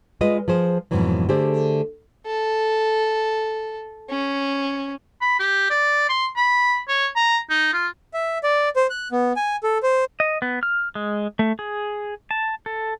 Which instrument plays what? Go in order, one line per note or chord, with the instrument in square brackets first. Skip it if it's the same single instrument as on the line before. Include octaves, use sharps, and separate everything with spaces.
[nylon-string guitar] G#3 F4 B4 D#5
F3 G#4 C5
F2 G#2 B2 E3 F#3
D3 A3 G4 G#4 C5
[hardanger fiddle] A4
C#4
[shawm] B5
G4
D5
C6
B5
C#5
A#5
D#4
F4
[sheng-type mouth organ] E5
D5
C5
F#6
B3
G#5
A4
C5
[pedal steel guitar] D#5
B3
F6
G#3
A3
G#4
A5
A4